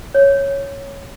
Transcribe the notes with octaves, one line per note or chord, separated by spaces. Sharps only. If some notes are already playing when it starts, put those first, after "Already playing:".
C#5